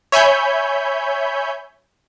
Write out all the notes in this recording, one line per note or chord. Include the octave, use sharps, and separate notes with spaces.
C#5 E5 G#5 B5 G6